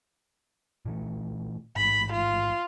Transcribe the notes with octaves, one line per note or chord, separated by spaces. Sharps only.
A#2 E3 A3
A1 G#2 B5
F4